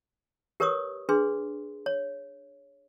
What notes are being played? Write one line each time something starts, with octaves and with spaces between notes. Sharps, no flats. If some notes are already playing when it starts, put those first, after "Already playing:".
G4 A#4 B4 C#5 C#6 D#6
D4 G#4 B4 C6
C#5